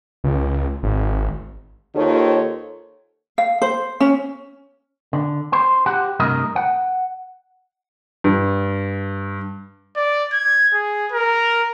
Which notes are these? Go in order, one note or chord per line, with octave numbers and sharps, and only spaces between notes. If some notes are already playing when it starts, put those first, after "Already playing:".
C#2
G#1
D#2 D#3 F4 A4 C5 C#5
F5
C5
C#4
D3
C5
G4 F#5
G2 C3 A3 A#4 D#5
F#5
G2
D5
G#6
G#4
A#4